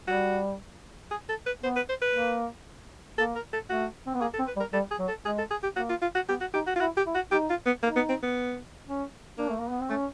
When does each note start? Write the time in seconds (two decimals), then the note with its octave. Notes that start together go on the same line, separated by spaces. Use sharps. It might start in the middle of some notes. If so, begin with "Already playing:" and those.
0.08 G3 F#4
1.11 G#4
1.29 A4
1.46 B4
1.63 B3 C5
1.76 B4
1.89 C5
2.02 B4
2.15 A#3
3.18 A#3 A4
3.35 A#4
3.53 A4
3.70 A3 F#4
4.07 C4
4.14 B3
4.21 A#3 G#4
4.34 A4
4.39 C4
4.47 B4
4.56 G3
4.60 A#4
4.73 G3 A4
4.91 G#4
4.99 F#3
5.08 A4
5.25 G#3 G#4
5.39 A4
5.51 G#4
5.63 G4
5.76 A#3 F#4
5.90 F4
6.02 F4
6.15 F#4
6.29 B3 G4
6.41 F#4
6.54 D#4 G4
6.67 F#4
6.76 F4
6.80 E4 F#4
6.97 G4
7.06 E4
7.15 F#4
7.32 D#4 G4
7.50 F4
7.66 B3
7.83 A#3 D#4
7.96 B3
8.09 C4
8.23 B3
8.88 C#4
9.38 A#3 D4
9.49 A3
9.60 A#3
9.70 B3
9.81 C4
9.90 A3 C#4